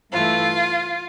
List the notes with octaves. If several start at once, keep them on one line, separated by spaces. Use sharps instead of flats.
G2 E3 A3 F4